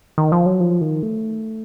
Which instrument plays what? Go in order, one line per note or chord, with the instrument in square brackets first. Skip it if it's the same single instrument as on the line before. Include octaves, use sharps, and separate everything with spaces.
[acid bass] D#3
F3
F#3
F3
D#3
A3